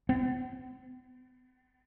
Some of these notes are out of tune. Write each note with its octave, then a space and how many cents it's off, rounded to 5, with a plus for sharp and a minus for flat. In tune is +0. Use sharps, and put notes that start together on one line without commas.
B3 +45